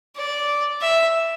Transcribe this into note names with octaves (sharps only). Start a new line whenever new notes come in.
D5
E5